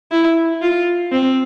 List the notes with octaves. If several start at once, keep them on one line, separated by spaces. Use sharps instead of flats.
E4
F4
C4